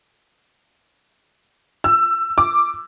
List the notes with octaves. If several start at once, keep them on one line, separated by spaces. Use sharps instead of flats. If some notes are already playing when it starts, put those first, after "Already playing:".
E6
D6